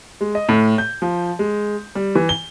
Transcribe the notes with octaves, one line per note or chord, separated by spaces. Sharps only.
G#3
D#5
A2
G6
F3
G#3
G3
E3
G7